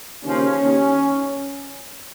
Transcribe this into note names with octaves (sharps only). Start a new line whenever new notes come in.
D#2 C#3 F3 C#4
D#2 D#3